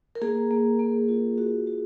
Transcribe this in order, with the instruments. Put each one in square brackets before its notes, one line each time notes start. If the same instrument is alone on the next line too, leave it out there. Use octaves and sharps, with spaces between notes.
[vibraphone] A#4
A#3 G#4
A#3
A#3
F4
F#4
F#4